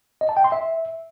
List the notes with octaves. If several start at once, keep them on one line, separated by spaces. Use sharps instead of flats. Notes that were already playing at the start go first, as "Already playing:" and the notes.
D#5
A5
G5
C6
E5